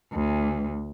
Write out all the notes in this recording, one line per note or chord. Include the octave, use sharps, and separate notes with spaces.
D2